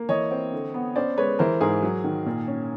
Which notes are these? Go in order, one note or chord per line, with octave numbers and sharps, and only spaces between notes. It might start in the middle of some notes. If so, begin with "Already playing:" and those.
Already playing: A#3
E3 C#5 D#5
C4
D3
B3
C#4 C5 D5
G#3 B4 C#5
E3 A#4 C5
G#2 G#4 A#4
F#3
D#3
A#2
C#4